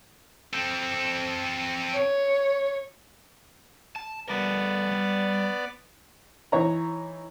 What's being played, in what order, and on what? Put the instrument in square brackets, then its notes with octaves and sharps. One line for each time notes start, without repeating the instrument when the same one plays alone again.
[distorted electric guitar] C4 A4
[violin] C#5
[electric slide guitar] A5
[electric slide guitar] G3 A3 A#4 [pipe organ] B3 D5
[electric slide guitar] G3
[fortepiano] E3 D#4 C#5 A#5